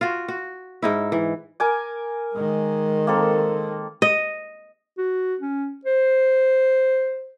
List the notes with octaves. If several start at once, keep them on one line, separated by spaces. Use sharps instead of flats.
F4 F#4
F#4
G#2 D#4 E4
E3
A#4 G#5 D6
D#3 G#3
A#3 C4 A4
D#5
F#4
C#4
C5